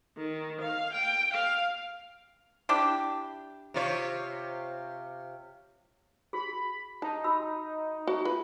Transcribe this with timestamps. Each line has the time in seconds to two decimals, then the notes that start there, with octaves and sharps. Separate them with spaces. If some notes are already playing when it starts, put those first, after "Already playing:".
0.17 D#3
0.61 F5
0.93 G5
1.34 F5
2.69 D4 E4 G4
3.74 C3 F4 C#5
6.33 F#4 G#4 B5
7.02 D#4 A5
7.24 F#4 B5 E6
8.07 F#4 E5
8.25 F4 B4